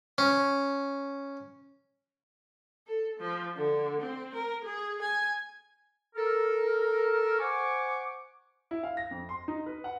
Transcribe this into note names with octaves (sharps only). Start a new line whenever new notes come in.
C#4
A4
F3
D3
C4
A#4
G#4
G#5
A4 A#4
C5 F#5 G#5 C#6 D6
E4
F5
A#6
F2
C6
D#4
B4
F#5